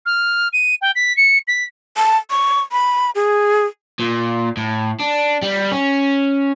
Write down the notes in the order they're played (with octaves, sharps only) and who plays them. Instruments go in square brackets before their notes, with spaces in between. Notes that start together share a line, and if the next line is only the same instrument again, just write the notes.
[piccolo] F6
D#7
G5
B6
C#7
B6
[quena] A5
C#6
B5
G#4
[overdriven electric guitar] A#2
A2
D4
G3
C#4